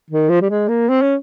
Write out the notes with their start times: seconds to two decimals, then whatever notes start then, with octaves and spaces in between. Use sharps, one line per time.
0.10 D#3
0.29 F3
0.41 G3
0.50 G#3
0.68 A#3
0.89 C4
1.02 C#4